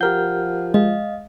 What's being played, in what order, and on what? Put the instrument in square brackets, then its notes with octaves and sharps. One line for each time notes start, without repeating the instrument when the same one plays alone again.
[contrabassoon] F3 [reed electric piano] G4 A#4 G6 [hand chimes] F#5 F6
[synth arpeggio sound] G#3 [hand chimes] D#5 F5